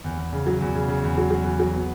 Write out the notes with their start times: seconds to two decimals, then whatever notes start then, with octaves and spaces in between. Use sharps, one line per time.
0.04 E2
0.18 E2
0.33 C#3
0.47 F#3
0.61 E2
0.75 C#3
0.88 C#3
1.03 E2
1.18 F#3
1.31 F#3
1.45 E2
1.60 F#3
1.74 B3